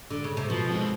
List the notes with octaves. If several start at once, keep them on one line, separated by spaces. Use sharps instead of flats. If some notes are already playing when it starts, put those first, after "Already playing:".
D3
C#3
C3
B2 F3
G#3 C4